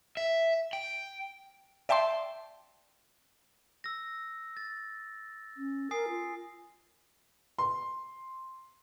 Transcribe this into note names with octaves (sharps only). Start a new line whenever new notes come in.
E5
G5
D5 E5 G5 A5 C6
E6 A#6
A6
C#4
A#4 G#5 D#6 C7
F4
C6